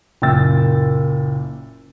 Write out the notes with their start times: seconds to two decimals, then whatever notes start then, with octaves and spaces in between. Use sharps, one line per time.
0.22 F#1 A#2 G5 E6 A6